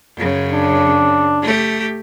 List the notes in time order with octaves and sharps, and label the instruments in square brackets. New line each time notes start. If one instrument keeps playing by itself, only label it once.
[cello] F#2 C#3
[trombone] D4
[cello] A3 G4